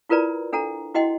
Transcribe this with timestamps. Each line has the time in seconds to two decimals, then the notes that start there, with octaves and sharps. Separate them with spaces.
0.09 E4 F4 A#4 B4 D5 A#5
0.53 D4 A4 F#5 A#5
0.94 E4 F#4 D#5 F#5 G5 C6